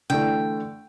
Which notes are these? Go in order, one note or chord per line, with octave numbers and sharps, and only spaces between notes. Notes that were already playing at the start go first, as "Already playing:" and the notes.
D3 E3 A3 G5